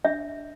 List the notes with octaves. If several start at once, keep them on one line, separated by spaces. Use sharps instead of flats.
D4 E5